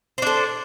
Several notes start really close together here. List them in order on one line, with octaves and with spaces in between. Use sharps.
C5 D4 A4